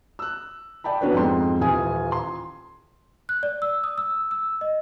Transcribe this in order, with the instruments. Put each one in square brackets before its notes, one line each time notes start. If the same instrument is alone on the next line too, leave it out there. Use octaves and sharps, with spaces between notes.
[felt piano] E6 F#6
D5 G5 A5 B5
B3 C#4 D4 F#4 B4 C#5
F2 G#2 G5 C6
D#1 E3 F4 F5 G#5 D#6
C6
[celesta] F#6
D5
E6
D#6
E6
E6
D#5